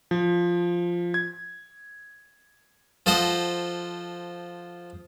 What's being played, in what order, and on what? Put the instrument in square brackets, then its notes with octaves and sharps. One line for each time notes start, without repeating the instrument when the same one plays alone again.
[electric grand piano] F3
G#6
[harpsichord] F3 A4 C5 D#5 F#5